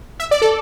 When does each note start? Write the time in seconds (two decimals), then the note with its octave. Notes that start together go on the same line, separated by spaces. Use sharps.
0.20 E5
0.31 D5
0.42 A4